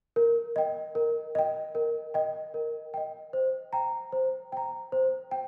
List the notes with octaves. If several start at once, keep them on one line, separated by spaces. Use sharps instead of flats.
A#4
D#5 G5
A#4
D#5 G5
A#4
D#5 G5
A#4
D#5 G5
C5
G5 A#5
C5
G5 A#5
C5
G5